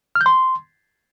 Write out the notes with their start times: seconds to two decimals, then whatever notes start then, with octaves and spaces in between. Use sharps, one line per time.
0.15 F6
0.21 G6
0.26 C6